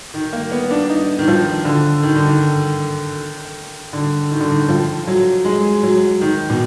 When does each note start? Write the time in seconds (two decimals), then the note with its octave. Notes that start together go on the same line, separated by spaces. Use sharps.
0.14 D#3
0.33 A#3
0.52 B3
0.71 D4
0.90 D#4
1.19 D#3
1.28 F3
1.65 D3
2.03 D#3
2.16 D3
2.27 D#3
3.93 D3
4.31 D#3
4.40 D3
4.50 D#3
4.69 F3
5.07 F#3
5.45 G#3
5.83 F#3
6.21 D#3
6.50 B2